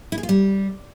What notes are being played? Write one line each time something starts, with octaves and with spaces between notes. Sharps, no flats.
E4
G#4
F4
G3